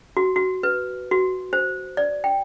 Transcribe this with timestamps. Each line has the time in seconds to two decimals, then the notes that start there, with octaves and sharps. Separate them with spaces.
0.17 F#4
0.36 F#4
0.63 B4
1.11 F#4
1.53 C5
1.97 D5
2.24 G5